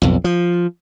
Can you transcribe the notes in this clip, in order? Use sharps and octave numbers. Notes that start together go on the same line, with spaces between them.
B1 F2
F3